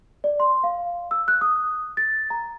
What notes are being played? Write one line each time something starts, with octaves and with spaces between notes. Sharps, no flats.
D5
C6
F5
E6
F#6
D#6
A6
A#5